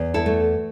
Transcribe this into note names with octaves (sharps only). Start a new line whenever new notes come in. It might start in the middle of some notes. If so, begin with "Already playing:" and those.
Already playing: E2
E4 A4
A3